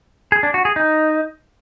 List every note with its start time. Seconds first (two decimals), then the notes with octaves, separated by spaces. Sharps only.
0.32 G#4
0.43 D4
0.54 F#4
0.65 G#4
0.76 D#4